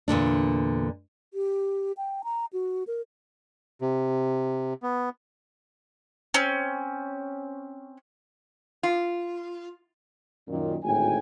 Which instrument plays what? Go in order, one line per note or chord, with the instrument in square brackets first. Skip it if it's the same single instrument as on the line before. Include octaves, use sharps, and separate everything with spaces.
[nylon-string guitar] E2 A#2 D3 D4
[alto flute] G4
G5
A#5
F#4
A#4
[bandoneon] C3
B3
[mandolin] C4 C#4
[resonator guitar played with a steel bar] F4
[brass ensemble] F#2 A#2 D#3
G#1 D2 A2 G5 G#5